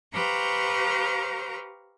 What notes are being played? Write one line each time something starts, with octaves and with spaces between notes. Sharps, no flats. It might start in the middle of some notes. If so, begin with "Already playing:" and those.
G4 B4 C5 F5 A#5 C#6